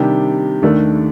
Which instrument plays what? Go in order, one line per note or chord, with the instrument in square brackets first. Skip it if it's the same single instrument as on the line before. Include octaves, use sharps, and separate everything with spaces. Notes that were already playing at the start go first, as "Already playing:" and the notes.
Already playing: [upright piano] C3 D#3 G3 D4 G4
D#2 D#3 A3 D4 A4